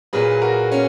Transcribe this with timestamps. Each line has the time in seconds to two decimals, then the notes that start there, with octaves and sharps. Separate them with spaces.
0.13 A#2 F#3 A#3 G#4 B4
0.42 F#4 A#4
0.72 C#4